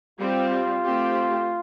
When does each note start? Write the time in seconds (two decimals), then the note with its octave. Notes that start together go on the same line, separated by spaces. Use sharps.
0.19 G3 C4 F4 G4
0.83 A3 C4 G4